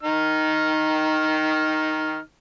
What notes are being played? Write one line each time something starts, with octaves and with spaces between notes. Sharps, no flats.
D#3 D#4 F6